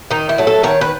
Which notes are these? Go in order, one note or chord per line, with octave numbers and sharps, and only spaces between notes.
D#3 D#4
E4
F#3 A3
A4
D#3 C#5
B4